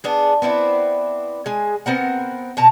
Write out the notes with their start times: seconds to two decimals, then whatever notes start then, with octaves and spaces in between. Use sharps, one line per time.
0.04 B3 D4 G#4
0.42 B3 C4 E4 D5
1.46 G#3 G#4
1.86 B3 C4 A#4 F#5
2.57 B2 A5 A#5